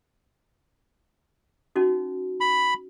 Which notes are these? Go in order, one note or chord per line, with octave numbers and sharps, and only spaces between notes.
C#4 D#4 F#4
B5